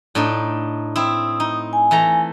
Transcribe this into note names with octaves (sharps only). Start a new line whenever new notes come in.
A2 D4 D#4
C4 E4 D#6
D#4
G#5
E3 A3 A#5